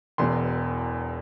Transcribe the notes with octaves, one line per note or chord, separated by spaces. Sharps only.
E1 E2 B2 C6